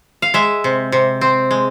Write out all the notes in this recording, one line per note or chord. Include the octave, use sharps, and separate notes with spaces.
F5
G#3 E5
C3
C3
C4
G#3